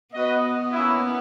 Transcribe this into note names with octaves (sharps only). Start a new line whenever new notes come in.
B3 F#4 B4 D#5
A#3 C#4 E4